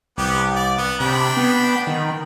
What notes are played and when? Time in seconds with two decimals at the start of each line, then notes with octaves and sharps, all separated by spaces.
0.18 C2 B3 G4
0.56 D5
0.78 B3
1.00 C3 D4 G5 B5
1.37 B3
1.87 D#3